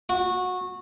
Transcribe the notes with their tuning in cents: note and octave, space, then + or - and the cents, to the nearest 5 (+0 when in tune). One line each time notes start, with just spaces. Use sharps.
F#4 -20